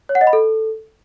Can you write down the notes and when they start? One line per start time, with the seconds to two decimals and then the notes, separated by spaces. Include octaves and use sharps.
0.09 C#5
0.15 F#5
0.21 D#5
0.27 B5
0.33 A4